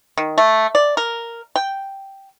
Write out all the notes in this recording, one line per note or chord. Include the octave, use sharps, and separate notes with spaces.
D#3
A3
D5
A#4
G5